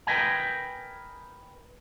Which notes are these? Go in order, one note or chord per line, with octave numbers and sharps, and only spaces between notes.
A#4 B4 D#5 G5 G#5